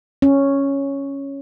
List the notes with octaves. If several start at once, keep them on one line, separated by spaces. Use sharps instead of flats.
C#4